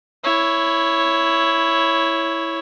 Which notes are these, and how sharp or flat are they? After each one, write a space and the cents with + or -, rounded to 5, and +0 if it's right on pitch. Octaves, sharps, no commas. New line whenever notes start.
E4 +0 C#5 +0